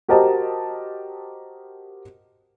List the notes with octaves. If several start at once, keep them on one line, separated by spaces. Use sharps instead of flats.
F#4 G4 A#4 C5 D#5 A5